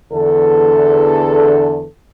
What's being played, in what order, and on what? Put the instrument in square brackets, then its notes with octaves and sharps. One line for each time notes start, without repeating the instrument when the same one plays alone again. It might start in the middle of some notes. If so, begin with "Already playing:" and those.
[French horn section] E2 D3 A4